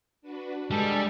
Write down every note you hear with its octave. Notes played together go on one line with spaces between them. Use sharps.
D4 F#4 B4
G3 G#3 D4 A4